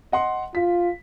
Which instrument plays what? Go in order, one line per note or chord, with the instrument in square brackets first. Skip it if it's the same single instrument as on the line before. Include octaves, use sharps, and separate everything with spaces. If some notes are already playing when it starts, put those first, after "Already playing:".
[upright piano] D#5 F#5 C6
[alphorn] F4 [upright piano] B6